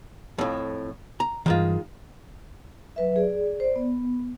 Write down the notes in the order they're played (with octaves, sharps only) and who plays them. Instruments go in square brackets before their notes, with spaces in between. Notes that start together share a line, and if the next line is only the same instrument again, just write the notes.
[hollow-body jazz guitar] F2 A2
A#5
[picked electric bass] G2 E3 [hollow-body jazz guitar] D#3 G#3 F4
[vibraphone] F#3 B4 E5
G#4 D5
C5 D5
B3